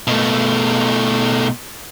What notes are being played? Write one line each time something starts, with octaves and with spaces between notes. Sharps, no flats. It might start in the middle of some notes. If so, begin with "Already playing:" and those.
B2 A3